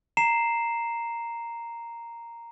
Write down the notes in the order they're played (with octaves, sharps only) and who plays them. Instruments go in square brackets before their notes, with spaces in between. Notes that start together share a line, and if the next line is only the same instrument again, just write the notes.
[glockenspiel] A#5 C7 E7